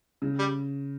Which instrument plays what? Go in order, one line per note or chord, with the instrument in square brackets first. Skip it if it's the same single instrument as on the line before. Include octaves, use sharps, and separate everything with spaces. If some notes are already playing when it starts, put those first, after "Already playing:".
[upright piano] C#3
[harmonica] G3